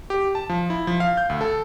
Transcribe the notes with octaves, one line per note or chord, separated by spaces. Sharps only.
G4
A5
F3
E4
F3
F5
G6
D2
A4